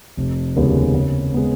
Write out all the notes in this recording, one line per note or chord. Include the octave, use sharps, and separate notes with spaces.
F1
D#2 C#3 G#3 B3
C#3
G#3 B3